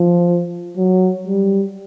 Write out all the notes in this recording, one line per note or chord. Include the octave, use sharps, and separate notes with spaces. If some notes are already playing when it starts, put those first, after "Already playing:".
Already playing: F3
F#3
G3